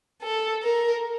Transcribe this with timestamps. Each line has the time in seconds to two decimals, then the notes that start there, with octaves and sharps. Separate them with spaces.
0.22 A4
0.63 A#4